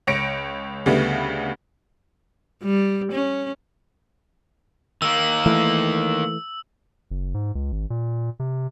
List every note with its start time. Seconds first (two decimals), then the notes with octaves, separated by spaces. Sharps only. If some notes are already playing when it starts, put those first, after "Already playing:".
0.07 C#2 C#5 A#6 C#7 D7
0.86 D2 C#3 G3 A3 B3
2.63 G3
3.12 C#4
5.02 D#3 A#3 E6
5.46 E3 A3
7.11 F#1
7.34 G#2
7.55 C#2
7.72 G#1
7.90 A#2
8.39 C3